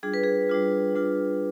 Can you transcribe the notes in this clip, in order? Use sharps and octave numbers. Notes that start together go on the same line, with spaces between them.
G3 D4 F4 G#4
B4
G#4
G3 D4 F4
G3 D4 F4